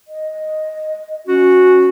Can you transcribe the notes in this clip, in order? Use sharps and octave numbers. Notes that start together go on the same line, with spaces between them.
D#5
C#4 F#4